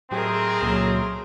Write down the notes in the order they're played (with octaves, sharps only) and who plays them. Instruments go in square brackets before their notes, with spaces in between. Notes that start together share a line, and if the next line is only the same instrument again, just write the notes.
[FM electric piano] A2 F#3 G4 [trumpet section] G#3 A3 C4 [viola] G#4 A#4
[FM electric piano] C#2 A#2 C#3 [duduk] F#3